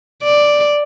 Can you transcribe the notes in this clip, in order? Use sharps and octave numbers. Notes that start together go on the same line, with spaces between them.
D5